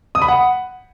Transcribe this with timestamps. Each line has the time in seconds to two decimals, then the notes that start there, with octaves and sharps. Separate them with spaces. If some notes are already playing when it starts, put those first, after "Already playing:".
0.15 D#6
0.22 B5
0.28 F#5